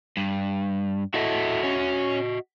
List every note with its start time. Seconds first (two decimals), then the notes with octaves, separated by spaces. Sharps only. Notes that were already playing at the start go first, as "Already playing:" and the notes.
0.17 G2
1.14 E4 F#4 A4 D#5 E5
1.63 C#4